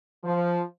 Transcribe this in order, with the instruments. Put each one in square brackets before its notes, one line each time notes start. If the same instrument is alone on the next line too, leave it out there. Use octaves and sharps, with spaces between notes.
[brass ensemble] F3